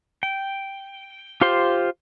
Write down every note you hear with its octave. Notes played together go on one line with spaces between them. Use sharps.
G5
F4 G4 C5 C6